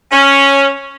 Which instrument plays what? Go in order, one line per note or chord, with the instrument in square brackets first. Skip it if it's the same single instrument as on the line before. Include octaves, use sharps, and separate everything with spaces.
[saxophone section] C#4